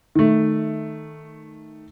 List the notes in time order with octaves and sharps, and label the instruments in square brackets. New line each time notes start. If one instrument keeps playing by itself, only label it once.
[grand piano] D#3 A3